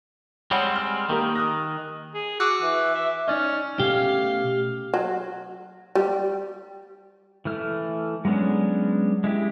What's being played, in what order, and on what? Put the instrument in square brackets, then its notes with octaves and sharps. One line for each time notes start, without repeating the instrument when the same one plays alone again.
[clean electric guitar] G3 G#3 C4 [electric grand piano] C#5 F#5 B5
[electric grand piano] F6
[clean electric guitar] D#3 [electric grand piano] A#3 G4 A#4
[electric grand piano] D#6 F#6 A#6
[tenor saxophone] G#4
[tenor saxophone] F#4 [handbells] D6 E6 F#6
[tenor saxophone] E3
E5
[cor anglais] C#4 [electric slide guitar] D#4 D5 D#5
[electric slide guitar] B2 A3 C#4 [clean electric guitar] G4 [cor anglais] F5
[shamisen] F#3
G3
[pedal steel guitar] E3 A3 F6
F#3 G#3 B3 C#4 D4
G#3 E4 G4